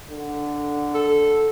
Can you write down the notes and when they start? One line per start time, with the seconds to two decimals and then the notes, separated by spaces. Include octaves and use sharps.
0.11 D3
0.95 A4